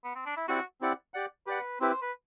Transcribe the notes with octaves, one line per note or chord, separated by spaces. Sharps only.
B3
C4
D4
E4
C4 E4 F#4 G4 D5 F#5
C4 E4 G4 D5 F#5
G4 D5 F#5
G4 B4 D5 F#5
C4 E4 G4 B4 C5
C5
B4